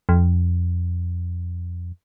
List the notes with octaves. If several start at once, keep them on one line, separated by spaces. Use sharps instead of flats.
F2